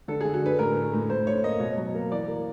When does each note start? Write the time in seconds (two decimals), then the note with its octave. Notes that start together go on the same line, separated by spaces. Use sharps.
0.08 D3 A4
0.21 D3 G#4
0.34 F#4
0.42 D3 B4
0.59 A2 A#4
0.76 A3
0.93 A2
1.10 A2 C5
1.27 A2 C#5
1.43 A#3 D#5
1.60 B2 C#5
1.77 F#3
1.95 A#3
2.12 E3 D5
2.28 A#3